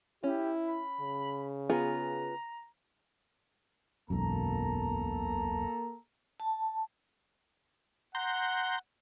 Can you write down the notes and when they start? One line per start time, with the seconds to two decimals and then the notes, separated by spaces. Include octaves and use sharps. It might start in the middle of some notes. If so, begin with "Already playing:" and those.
0.24 C#4 E4 G4
0.65 B5
1.00 C#3
1.69 B3 F4 G#4 A#5
4.10 E1 B1 F#2 A#3 A4 A#5
6.40 A5
8.15 F#5 A#5 C6 G6